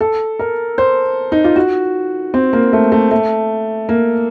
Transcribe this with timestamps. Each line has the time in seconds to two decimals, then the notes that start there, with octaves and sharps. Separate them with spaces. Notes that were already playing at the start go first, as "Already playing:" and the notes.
0.01 A4
0.39 A#4
0.78 C5
1.32 D#4
1.44 F4
1.56 F#4
2.34 C4
2.53 A#3
2.73 A3
2.92 A3
3.11 A3
3.89 A#3